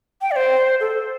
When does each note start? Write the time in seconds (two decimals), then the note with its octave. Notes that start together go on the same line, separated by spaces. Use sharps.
0.22 G5
0.31 D5
0.36 C5
0.80 A4